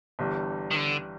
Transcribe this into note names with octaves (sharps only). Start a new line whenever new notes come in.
G1 G2 E3 G3
D#3
D3